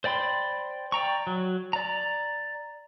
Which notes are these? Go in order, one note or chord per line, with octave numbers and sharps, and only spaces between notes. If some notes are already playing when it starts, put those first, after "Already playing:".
C5 D5 G5 B5 C6
D5 G5 A#5 C#6
F#3
D5 A#5